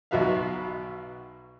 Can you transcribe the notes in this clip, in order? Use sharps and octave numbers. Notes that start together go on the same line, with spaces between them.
B1 B2 F#4 B4 E5 F5